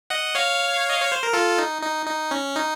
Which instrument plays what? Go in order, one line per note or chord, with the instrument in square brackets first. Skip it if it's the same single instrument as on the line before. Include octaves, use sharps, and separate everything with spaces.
[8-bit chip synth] D#5 F#5
C#5 F5
D#5
C#5
C5
A#4
F4 A4
D#4
D#4
D#4
C#4
D#4